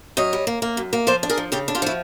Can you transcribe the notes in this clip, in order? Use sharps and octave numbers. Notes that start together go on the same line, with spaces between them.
F#2 C#5 D#5
G3
A#3
A#3
F#2
A#3
F3 C5 D5
D4
G#4 A#4
F3
C#3 G4 A4
D4
F4 G4
F3 E4 F#4